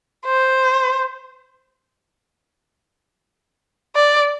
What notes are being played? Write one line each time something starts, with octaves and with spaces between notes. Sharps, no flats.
C5
D5